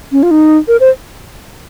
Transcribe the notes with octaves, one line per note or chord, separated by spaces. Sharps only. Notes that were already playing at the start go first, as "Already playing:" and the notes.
C#4
F4
D#4
A#4
C5